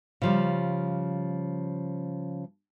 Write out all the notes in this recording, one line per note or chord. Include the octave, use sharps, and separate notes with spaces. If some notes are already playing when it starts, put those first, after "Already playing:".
C#3 F3 G3